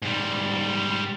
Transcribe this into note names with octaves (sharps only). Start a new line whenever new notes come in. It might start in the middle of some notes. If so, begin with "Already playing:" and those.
G#2 G3